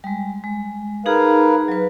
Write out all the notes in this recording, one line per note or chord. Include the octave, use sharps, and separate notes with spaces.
G3 G#3
G#3
D#4 G#4 A#4 B4 F5
F#3 B4